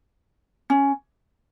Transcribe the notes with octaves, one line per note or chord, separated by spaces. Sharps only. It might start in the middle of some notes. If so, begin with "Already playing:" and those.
C#4